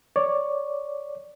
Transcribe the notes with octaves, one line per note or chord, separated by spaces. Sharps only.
C#5 D5